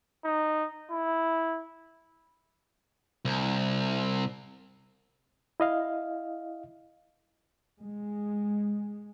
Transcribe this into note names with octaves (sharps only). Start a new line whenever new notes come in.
D#4
E4
C2
E4 D#5 F5
G#3